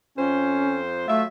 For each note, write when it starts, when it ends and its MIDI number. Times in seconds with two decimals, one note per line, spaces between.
0.18 1.05 41
0.18 0.80 61
0.18 1.05 72
1.08 1.25 54
1.08 1.23 57
1.08 1.25 65
1.08 1.25 76